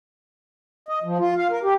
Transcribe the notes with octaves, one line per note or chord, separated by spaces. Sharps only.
D#5
F3
F4
F5
A#4
G4